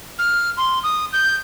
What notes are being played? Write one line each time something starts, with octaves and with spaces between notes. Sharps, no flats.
F6
C6
D#6
G6